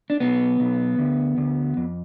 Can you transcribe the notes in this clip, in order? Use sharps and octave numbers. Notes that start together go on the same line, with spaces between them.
D4
B1 B3
B1
D2
D2
F2